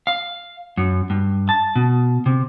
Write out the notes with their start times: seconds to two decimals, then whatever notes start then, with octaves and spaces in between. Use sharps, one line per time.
0.07 F5
0.77 F#2
1.10 G2
1.49 A5
1.76 B2
2.26 C3